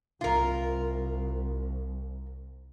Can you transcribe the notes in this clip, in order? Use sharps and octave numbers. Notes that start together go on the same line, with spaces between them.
C2 F4 A#4